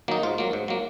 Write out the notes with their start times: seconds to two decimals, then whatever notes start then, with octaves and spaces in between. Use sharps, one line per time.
0.08 D#3 F#3 A#3 D#4
0.23 G#2 F4
0.38 F#3 A#3
0.53 G#2
0.68 F#3 A#3